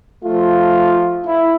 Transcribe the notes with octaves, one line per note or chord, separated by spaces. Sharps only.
F3 A3 F4
E4